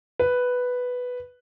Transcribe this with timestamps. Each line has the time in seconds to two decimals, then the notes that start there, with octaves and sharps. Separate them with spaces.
0.19 B4